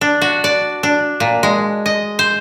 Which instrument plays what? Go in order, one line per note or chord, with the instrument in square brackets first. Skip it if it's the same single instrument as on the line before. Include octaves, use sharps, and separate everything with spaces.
[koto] D4
F#4
D5
D4
A#2
G#3
D#5
C5